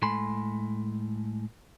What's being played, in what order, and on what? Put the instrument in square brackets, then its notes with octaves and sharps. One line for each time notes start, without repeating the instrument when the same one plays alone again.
[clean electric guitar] A2 G#3 A4 G#5 B5 C6